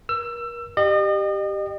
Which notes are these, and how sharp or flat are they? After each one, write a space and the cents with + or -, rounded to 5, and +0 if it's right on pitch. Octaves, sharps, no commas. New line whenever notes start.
A#4 +35 E6 +25
G4 +0 D#5 -40